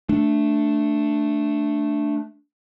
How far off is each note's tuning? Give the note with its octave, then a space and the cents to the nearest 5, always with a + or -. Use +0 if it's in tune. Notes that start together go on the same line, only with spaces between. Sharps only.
A3 +0 D4 +0